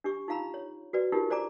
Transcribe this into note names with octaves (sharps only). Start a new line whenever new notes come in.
D4 G4 C#6
D#4 F4 F5 A#5 B5
C#5
F#4 B4 D5
D4 D#4 F4 G4 A#4
C5 D5 G#5 A#5 D6